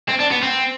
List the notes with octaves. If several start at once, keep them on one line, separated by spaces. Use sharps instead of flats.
C4
D4
B3
C4